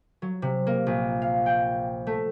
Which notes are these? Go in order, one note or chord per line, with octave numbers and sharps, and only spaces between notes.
F#3
C3
A#3
A#1
F5
G5
A3